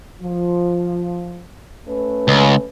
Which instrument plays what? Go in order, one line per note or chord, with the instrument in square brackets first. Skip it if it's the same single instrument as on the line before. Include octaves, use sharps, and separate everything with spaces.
[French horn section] F3
A3 C#4 B4
[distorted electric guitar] C#2